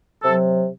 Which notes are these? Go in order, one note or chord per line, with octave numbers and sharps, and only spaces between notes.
C3 F#3 A4